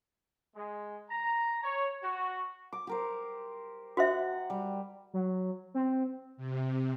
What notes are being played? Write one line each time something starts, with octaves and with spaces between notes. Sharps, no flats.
G#3
A#5
C#5
F#4
D6
G4 A#4 C5
F#4 C5 E5 F#5
G3
F#3
C4
C3